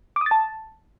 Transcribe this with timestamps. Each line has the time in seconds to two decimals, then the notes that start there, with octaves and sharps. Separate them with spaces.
0.16 D6
0.21 D#6
0.26 A6
0.31 A5